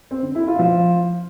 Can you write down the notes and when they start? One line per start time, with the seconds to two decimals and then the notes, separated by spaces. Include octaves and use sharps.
0.11 C4
0.23 D3
0.35 E4
0.47 F4
0.59 F3